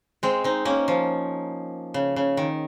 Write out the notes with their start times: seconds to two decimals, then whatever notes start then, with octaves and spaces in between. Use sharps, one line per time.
0.23 G#3 C4
0.44 C4 D#4
0.65 A#3 C#4
0.88 F3
1.94 C#3
2.16 C#3
2.37 D#3